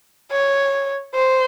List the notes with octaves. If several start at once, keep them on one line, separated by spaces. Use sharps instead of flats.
C#5
C5